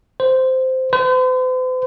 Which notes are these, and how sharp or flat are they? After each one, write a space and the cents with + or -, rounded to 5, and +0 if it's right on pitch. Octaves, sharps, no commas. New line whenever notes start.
C5 -10
C5 -45